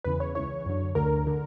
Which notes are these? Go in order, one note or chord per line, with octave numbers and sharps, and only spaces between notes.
E2 C#3 E3 B4
C#5
C#2 C#3 E3 C#5
F#2 D3
D2 D3 A#4
D3